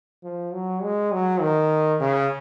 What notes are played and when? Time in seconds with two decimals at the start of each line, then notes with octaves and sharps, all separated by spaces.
0.24 F3
0.53 F#3
0.82 G#3
1.12 F#3
1.41 D#3
2.00 C#3